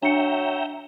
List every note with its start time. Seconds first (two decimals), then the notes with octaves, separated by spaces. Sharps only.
0.03 F#3 D4 E5 G5 A#5 C#7